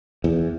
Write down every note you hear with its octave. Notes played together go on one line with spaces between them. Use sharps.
E2